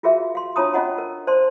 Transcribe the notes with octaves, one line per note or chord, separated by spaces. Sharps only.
F4 F#4 G#4 A#4 E5 F5
F5 C6
D4 F4 C#5 A5 A#5 D#6
C#4 F4 D#5 F#5 A#5
A#4
C5 D5 A5 C6